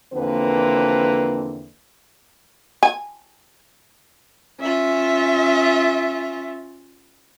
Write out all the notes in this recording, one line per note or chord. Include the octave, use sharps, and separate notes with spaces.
E2 D3 F3 A#3 C4 B4
G#5
C#4 F4 E5